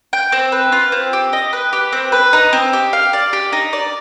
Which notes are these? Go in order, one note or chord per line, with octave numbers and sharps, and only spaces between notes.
G5
C4
B4
F4
C4
G4
D#5
B4
G4
C4
B4
D#4
C4
G4
F5
D5
G4
D#4
D5